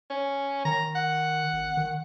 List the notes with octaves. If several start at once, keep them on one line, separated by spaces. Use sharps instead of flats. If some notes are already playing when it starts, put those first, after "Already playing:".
C#4
D#3 A#5
F#5
G#1
D#3